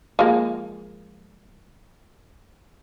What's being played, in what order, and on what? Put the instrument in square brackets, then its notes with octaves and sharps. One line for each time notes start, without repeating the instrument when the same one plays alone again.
[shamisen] F3 G#3 A#3